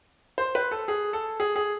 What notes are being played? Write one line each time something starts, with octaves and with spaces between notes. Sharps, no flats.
C5
B4
A4
G#4
A4
G#4
G#4